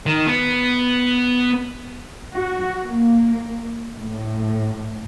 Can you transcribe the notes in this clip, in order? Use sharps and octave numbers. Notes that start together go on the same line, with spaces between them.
D#3
B3
F#4
A#3
A2